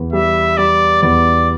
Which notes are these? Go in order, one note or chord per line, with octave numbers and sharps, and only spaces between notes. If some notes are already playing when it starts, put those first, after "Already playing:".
Already playing: E2
G3 E5
G3 D5
E2 D5